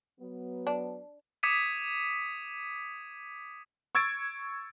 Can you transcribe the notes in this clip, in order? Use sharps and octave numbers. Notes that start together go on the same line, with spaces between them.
F#3 B3
D4
D6 D#6 G#6 B6 C#7 D#7
C#6 E6 G#6 A6 D7